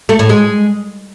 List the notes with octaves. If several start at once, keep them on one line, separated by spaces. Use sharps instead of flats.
A3
A2
G#3